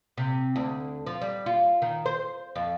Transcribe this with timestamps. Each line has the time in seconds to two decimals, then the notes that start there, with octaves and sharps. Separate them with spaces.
0.17 C3
0.56 D2
1.06 F3
1.21 G3
1.46 F4
1.82 D#3
2.06 C5
2.56 F2